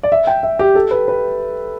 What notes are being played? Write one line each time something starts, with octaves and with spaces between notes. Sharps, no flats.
D5
E5
G5
E5
G4
A4
B4
B4